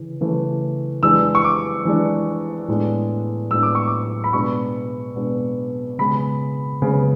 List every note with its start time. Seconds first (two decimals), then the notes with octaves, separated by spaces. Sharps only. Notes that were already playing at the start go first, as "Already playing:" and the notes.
Already playing: C#3 E3
0.21 C#3 E3 A3
1.03 E3 G#3 D4 E6
1.35 C#6
1.44 D6
1.85 E3 G#3 D4
2.68 A2 G#3 B3 D4
3.51 A2 G#3 B3 D4 E6
3.63 D6
3.75 C#6
3.88 D6
4.24 B5
4.33 B2 G#3 B3 D4 C#6
5.16 B2 G#3 B3 D4
5.98 C#3 G#3 B3 B5
6.82 C#3 G#3 B3